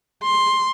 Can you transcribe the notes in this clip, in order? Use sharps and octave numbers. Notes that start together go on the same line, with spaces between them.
C6